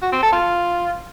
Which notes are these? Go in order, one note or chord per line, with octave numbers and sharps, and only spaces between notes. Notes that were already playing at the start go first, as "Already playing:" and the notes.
F#4
C4
A4
F4